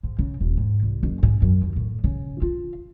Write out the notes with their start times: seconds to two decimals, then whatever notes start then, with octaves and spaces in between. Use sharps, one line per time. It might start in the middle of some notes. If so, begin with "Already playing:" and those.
0.03 G#2
0.19 C#3
0.41 D#1
0.57 G#2
0.83 C2
1.03 F#1
1.23 G#2
1.42 F#2
1.63 D#2
1.76 A2
2.04 C#3
2.42 F4